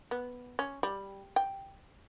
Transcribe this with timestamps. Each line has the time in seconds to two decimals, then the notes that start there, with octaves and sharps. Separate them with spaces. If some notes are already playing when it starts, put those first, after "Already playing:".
0.11 B3
0.59 C#4
0.83 G3
1.36 G5